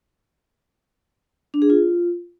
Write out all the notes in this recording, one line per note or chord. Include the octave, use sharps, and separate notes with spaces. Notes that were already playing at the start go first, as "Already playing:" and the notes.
D4
G#4
F4